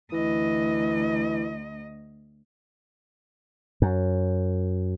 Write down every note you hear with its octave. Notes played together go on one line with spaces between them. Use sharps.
D2 E3 D#5
F#2